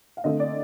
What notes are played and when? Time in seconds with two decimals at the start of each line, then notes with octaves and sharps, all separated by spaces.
0.17 F5
0.24 D3 A3 C4 D#5
0.40 D5